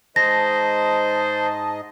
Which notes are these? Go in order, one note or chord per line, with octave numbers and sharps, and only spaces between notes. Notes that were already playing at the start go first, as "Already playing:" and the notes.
G#2 C5 D#5 A5 A#6